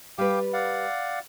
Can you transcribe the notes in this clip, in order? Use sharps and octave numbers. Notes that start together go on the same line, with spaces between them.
G3 B4 F5 G5 D6
D5 F5 F#5